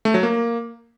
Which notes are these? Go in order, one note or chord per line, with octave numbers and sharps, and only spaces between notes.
A3
F#3
A#3